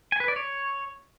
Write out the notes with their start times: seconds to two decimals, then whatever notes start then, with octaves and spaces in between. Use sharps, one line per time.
0.12 G#5
0.20 B4
0.28 D5
0.36 C#5